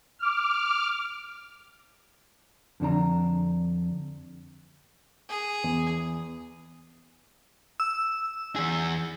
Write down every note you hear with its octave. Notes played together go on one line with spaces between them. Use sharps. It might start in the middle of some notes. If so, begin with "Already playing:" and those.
D6 F6
F2 D3 D4 A#5
G#4
E2
E6
E2 G#4